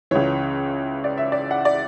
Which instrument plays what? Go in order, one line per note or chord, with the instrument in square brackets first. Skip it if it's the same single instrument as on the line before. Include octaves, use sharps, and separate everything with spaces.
[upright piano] C#2 C#3 E3 C#5
D5
E5
D5
F#5
D5